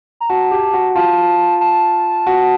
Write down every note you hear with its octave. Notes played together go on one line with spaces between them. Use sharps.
A#5
F#4 A5
G4
F#4
F4 A5
A5
F#4